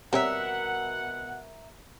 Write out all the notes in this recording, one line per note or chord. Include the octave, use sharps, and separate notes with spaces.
B2 G3 C4 A#4 C#5 E5 F#5